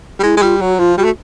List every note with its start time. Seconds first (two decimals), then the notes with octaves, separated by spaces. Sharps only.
0.19 G3
0.23 G#3 E4
0.37 G#3
0.42 G3 F4
0.61 F#3 F#4
0.79 F3 F4
0.98 G3 F#4
1.05 A3